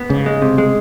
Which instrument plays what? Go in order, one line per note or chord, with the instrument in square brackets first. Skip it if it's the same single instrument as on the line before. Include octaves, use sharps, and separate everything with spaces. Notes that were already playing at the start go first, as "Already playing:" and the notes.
Already playing: [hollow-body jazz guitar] B3
[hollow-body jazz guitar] G#2 [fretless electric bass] C#3
[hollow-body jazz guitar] G#3
C3
G#3